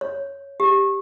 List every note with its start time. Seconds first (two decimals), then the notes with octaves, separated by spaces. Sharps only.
0.01 C#5
0.60 G4